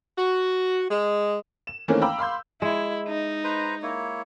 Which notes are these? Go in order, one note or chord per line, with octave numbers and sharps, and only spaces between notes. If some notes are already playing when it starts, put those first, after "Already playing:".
F#4
G#3
E7
D#3 E3 A3 A#3 C4 C#4
F5 G5 A#5 B5 D6 E6
F5 B5 C6 G6
G#3 E4
D#4
B4 C5 A#5
A#3 E4 C#5